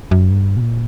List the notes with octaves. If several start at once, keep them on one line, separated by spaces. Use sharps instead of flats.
F#2
G2
B2
A#2